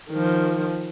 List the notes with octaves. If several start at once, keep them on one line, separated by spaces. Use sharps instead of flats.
D#3 F3